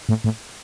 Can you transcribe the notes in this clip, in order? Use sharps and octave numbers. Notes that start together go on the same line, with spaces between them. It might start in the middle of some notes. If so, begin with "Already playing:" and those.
A2
A2